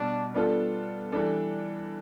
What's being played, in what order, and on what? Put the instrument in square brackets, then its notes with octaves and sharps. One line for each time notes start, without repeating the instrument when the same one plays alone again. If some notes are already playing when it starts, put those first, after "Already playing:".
Already playing: [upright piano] B2 G3 [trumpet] D4
[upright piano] G3 B3 D4 F4 A4
E3 G3 D4 A4